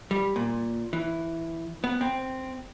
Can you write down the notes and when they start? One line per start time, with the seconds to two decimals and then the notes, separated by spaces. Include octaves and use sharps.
0.11 G3
0.36 A#2
0.93 E3
1.84 B3
2.01 C4